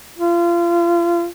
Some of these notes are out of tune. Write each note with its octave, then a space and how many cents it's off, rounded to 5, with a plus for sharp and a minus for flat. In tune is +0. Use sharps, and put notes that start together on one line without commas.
F4 -30